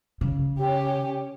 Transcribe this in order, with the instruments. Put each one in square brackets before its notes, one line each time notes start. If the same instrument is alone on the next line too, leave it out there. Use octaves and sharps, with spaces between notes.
[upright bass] C#3
[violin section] C#4 G4